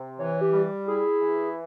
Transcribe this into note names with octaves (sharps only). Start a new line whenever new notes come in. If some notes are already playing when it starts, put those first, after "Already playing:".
Already playing: C3
E3 C#5
G4
G3
E4 G#4
E3